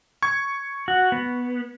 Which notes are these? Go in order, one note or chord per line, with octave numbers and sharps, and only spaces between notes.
C#6 G#6
F#4
B3